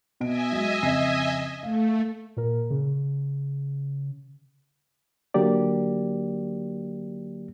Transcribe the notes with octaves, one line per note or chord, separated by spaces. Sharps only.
B2 F#4 D#5 E5 G#5 D7
F#3 G#3
F2 C#3 C7
A3 F5
A#2 A#4
C#3
D3 F#3 A#3 G4 D5